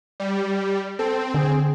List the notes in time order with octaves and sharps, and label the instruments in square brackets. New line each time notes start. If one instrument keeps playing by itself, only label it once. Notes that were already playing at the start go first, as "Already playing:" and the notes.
[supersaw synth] G3
[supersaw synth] C4 [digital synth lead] A4
[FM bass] D3 [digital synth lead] G#4